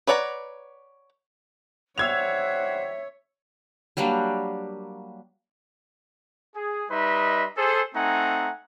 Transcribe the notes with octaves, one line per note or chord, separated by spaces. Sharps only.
B4 C#5 D5 F#5 A#5
G3 C5 C#5 E5 F#5 E6 G#6 F7
F#3 G3 A#3 D4
G#4
G3 D#4 B4 D#5 E5 C6
G#4 A4 C5
A3 C4 D#4 F#5 G#5 A#5